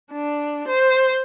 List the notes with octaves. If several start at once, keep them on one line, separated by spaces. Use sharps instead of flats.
D4
C5